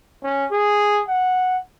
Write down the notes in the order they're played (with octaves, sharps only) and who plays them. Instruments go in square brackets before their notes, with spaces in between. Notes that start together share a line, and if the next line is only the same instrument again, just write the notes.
[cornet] C#4
G#4
F#5